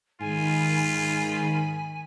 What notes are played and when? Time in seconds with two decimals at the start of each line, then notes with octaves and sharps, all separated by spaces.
0.20 G#2 D#3 F4 G#5 B5